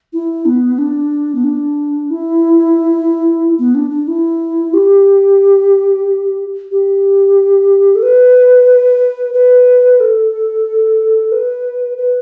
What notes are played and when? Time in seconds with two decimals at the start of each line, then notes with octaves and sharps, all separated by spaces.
0.13 E4
0.46 B3
0.78 D4
1.35 B3
1.44 D4
2.10 E4
3.59 B3
3.75 D4
3.91 D4
4.08 E4
4.74 G4
6.71 G4
7.95 A4
8.02 B4
9.34 B4
10.00 A4
11.32 B4
11.97 B4